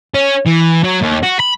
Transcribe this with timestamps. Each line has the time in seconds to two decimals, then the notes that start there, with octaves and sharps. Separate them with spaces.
0.15 C#4
0.46 E3
0.84 F#3
1.03 D#2
1.23 F#4
1.40 B5